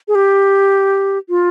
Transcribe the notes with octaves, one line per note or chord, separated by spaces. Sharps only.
G#4
G4
F4